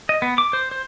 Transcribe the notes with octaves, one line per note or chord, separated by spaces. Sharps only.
D#5
B3
D6
C5
C5